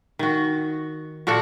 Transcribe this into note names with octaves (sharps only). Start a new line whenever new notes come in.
D#3 F#4
A#2 F#4 A4 F#5